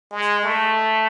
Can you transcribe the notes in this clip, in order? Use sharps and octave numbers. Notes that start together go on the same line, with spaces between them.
G#3
A3